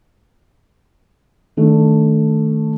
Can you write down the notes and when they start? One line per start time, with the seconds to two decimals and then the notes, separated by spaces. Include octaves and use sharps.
1.57 D#3 A3 D4